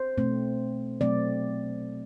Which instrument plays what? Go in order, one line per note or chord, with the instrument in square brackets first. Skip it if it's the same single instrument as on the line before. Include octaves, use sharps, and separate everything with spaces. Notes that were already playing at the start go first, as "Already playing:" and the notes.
Already playing: [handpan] C5
B2 A3 C4
B2 F#3 A3 C4 D5